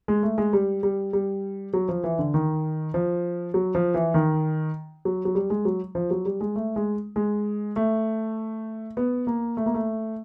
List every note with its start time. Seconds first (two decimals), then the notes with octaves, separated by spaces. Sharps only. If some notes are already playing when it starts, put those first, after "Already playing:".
0.08 G#3
0.23 A3
0.38 G#3
0.53 G3
0.83 G3
1.13 G3
1.74 F#3
1.88 F3
2.04 E3
2.19 D3
2.34 D#3
2.94 F3
3.54 F#3
3.75 F3
3.94 E3
4.14 D#3
5.05 F#3
5.25 F#3
5.35 G3
5.50 G#3
5.65 F#3
5.95 F3
6.11 F#3
6.25 G3
6.41 G#3
6.56 A3
6.76 G#3
7.16 G#3
7.76 A3
8.97 B3
9.27 A#3
9.57 A3
9.66 A#3
9.74 A3